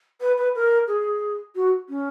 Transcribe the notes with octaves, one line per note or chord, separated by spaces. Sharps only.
B4
B4
A#4
G#4
F#4
C#4